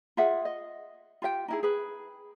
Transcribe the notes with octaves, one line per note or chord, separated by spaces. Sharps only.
F4 G#4 E5 F#5
D#5
F4 G4 E5 G5
D#4 E4 G#4
G#4 B4